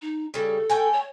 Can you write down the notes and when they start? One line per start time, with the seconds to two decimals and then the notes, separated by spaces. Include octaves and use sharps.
0.02 D#4
0.34 C#3 G3 A4
0.70 A3 G5 G#5
0.93 C#5